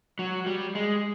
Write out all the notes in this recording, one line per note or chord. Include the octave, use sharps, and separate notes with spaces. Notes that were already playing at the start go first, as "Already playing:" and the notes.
F#3
G3
G#3